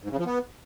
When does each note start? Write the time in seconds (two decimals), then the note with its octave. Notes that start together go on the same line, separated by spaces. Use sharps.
0.03 G#2
0.11 C#3
0.18 F3
0.25 B3